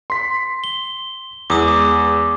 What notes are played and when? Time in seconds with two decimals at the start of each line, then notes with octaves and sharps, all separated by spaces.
0.10 C6 B6
0.64 G7
1.50 E2 G#3 D6 D#6